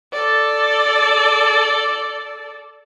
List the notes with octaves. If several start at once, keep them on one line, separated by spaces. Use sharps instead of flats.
A4 D5